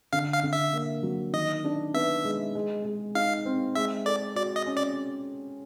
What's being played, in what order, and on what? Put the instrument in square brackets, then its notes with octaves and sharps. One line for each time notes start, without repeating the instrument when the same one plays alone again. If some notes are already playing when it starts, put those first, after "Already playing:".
[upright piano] D3 [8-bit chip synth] F5
[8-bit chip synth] F5
[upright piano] D3
[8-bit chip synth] E5
[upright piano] A#3
F#3
[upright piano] D#3 [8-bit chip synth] D#5
[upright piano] D4
[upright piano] B3 [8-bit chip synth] E5
[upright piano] G#3
G#3
G#3
[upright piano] D#4 [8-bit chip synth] F5
[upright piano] C4
[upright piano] G#3 [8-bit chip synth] E5
[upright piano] A4 [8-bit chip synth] D5
[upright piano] F#4 [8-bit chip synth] D5
[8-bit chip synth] D#5
[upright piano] C#4
[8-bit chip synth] D5